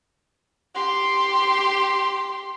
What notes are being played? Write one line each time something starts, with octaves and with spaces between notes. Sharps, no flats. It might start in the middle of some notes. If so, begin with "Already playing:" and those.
G4 C6